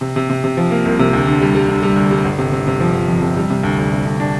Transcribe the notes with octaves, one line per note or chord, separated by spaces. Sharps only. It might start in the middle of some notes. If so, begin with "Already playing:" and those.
C3
C3
C3
C3
F3
A#3
C2
C3
D2
D3
G3
G3
D3
G3
D2
G3
G1
C3
C3
C3
F3
G1
F2
C3
G3
C3
D2
D2
C3
D2
D4